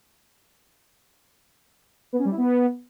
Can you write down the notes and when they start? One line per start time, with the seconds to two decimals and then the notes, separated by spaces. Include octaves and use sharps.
2.13 B3
2.19 C#4
2.25 G3
2.31 E4
2.38 B3